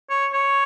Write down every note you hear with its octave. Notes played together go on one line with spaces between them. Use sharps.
C#5
C#5